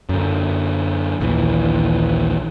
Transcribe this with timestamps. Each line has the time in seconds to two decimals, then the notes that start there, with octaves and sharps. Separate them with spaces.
0.09 F#2 D3
1.21 A#1 D#2 E3